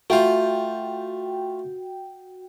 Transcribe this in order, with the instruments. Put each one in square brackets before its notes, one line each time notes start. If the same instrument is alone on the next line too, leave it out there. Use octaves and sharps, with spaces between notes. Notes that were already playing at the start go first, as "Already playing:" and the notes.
[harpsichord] A3 F4 [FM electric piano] F#4 G5